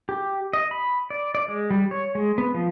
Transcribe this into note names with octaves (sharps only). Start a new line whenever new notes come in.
G4
D#5
B5
D5
D5
G#3
G3
C#5
G#3
B3
F3